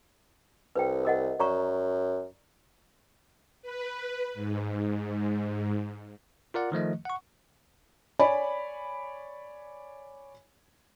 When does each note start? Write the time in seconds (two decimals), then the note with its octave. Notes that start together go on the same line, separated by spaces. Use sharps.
0.75 C2 B4 G5
1.05 A#4 D#5 F#5
1.40 F#2 D5 A#5 C#6
3.62 B4
4.34 G#2
6.54 F4 A#4 D5 F#5
6.72 D#3 F3 A3 D#5
7.05 F#5 C#6
8.19 C#5 D5 G#5 B5